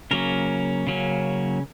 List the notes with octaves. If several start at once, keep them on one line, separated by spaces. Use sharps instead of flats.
C#3 F#3 A#3 C#4 A#4
C#3 F#3 A#3 C#4